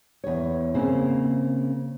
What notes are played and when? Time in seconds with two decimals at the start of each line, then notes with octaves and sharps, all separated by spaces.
0.24 E2 C#5
0.74 C#3 A#3 C4 C5